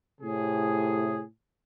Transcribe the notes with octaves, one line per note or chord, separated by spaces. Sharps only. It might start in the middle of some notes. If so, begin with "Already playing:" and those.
A2 C3 G#4